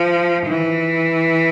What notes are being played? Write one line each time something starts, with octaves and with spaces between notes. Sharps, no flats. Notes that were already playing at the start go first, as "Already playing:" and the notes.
Already playing: F3
E3